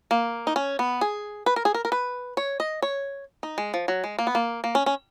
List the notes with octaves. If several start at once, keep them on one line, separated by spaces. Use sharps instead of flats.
A#3
D#4
C#4
B3
G#4
B4
A#4
G#4
A#4
A#4
B4
C#5
D#5
C#5
D#4
G#3
F3
F#3
G#3
A#3
B3
A#3
A#3
C#4
C#4